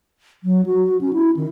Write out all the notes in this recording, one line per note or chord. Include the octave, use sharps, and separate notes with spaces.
F#3
F#4
C#4
E4
D#3